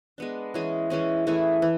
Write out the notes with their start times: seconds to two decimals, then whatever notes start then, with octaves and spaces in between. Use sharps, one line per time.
0.18 G#3 B3 D4
0.54 E3 G#3 C#4 G#4
0.90 E3 G#3 C#4 G#4
1.27 E3 A3 E4 G#4
1.62 E3